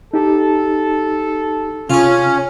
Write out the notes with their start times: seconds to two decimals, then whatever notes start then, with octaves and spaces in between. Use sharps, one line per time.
0.14 D#4 G4 A4
1.90 C3 C#4 F4 G#4